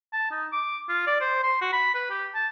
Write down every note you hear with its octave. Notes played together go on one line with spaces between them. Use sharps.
A5
D#4
D6
F4
D5
C5
C6
F#4
B5
B4
G4
A5